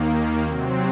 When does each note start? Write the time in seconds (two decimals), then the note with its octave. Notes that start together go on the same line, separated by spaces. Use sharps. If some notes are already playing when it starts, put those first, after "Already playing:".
Already playing: D#2 D#3 A#3
0.44 C3 F#3 C4